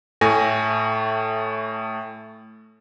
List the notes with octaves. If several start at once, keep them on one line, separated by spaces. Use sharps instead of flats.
A2 A3 G#5 A#6